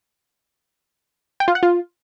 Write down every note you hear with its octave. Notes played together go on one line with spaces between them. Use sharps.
G5
F4
F#5
F4